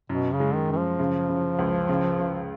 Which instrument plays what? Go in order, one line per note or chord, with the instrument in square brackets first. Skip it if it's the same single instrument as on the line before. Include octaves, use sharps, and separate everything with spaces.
[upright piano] F#2 [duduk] B2
[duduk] C#3
[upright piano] G#3
[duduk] D#3
[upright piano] F#2 [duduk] D#3
[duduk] F3
[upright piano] C#3
C#3
C#2
C#3
C#3